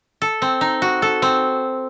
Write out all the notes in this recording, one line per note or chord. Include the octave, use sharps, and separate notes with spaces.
A4
C4
D#4
F#4
A4
C4